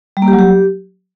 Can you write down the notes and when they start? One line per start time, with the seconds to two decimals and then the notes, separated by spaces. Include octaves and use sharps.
0.17 G3
0.22 A#3
0.28 G4
0.33 F#3
0.39 G4